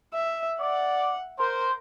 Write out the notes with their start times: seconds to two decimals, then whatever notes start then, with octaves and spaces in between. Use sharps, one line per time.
0.14 E5
0.60 D5 F#5
1.39 A#4 C5